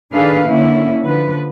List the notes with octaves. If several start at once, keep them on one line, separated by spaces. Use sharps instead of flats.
D#3 D4 G#4 A4 B4 F5
D3 A#3 C#4 E4
D3 F3 B4